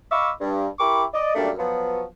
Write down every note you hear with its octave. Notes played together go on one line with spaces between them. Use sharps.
D#5 F5 B5 C#6 D6 E6
G2
E4 G4 A#4 B5 C#6 D6
D5 D#5
F#2 G3 A3 A#3 D4
F3 F#3 B3